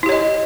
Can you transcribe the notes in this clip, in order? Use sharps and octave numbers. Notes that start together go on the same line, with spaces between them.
E4 G4 C#5 D#5